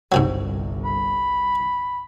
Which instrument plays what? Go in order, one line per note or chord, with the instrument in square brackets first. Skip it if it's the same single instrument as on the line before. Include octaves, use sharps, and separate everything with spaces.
[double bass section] G1 C2 [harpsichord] G#2 C3 F#3
[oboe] B5